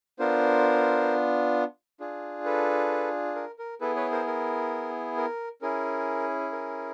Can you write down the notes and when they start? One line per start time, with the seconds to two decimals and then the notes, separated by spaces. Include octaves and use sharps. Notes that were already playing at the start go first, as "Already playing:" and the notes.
0.19 B3 D4 F4 A#4 C5
2.00 D4 F4 G#4
2.45 A4 B4
3.36 A#4
3.59 A#4
3.81 B3 E4 G#4 A4 B4
3.96 B4 C#5
4.11 A#4 C5
4.26 A#4
5.17 A#4
5.62 C#4 E4 G#4 A#4
6.52 A#4